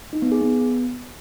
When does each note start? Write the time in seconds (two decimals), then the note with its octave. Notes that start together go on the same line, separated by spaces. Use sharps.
0.13 D#4
0.22 B3
0.32 G#4
0.41 B3